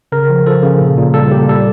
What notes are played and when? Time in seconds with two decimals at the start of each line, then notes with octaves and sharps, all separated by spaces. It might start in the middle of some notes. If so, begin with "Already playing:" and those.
0.12 C#3 A#4
0.30 F3
0.46 F3 A4
0.63 C#3
0.80 A#2
0.98 A#2
1.14 G3 A4
1.31 A#2 G4
1.49 G3 A4